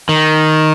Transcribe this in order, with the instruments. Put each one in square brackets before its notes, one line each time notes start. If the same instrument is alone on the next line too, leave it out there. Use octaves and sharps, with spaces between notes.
[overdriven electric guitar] D#3